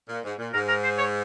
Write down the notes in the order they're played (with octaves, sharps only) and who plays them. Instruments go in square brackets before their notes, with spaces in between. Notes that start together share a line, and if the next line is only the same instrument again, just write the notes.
[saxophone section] A#2
G#2
A#2
[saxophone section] G#2 [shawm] A#4
[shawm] A#4
C5
C#5